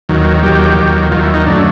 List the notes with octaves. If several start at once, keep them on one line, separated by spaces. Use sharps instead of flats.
D#2 D#3 F#3
D#2 D#3 F#3 G4
D#2 D#3 F#3
D#2 D#3 F#3 F4
E4
D#4
F#2 D3 F#3 A3 D4